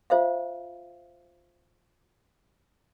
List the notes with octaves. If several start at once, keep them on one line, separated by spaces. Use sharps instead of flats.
F4 C5 E5 F5